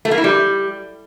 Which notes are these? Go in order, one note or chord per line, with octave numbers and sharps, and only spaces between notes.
A3
A#3
E4
G3